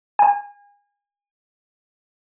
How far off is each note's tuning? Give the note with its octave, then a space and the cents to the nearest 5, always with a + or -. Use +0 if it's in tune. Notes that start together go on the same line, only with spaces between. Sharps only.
G#5 -35